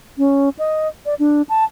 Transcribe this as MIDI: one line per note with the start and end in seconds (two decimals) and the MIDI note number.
0.18 0.49 61
0.59 0.88 75
1.06 1.15 74
1.19 1.42 62
1.49 1.64 81